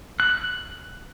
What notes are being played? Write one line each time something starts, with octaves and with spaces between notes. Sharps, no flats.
F#6